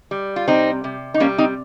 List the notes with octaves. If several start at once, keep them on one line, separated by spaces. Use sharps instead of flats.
G3
F4
C3 C4 D#4
C3
D#4
G3 A#3 C#4
C4 D#4